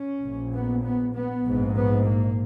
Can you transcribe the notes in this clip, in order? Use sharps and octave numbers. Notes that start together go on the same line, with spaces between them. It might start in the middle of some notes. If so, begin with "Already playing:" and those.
Already playing: C#4
A#1 A#2
B3
B3
B3
A#1 G#2
B3
A#3